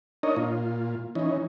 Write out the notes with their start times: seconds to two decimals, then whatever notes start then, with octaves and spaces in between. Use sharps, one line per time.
0.23 D4 D#4 A#4 C#5 D#5
0.36 A#2 F4
1.15 E3 C#4 D#4